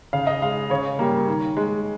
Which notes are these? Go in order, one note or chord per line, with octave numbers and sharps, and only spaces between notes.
C#3 F5
D#5
G#3 F5
C#3 C#5
G3 A#3
D#3
G#3